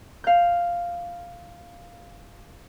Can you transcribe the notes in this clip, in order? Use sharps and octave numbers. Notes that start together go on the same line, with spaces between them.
F5 G6